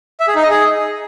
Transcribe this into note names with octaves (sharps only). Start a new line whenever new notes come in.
E5
G#4
D#4
D#5
G#4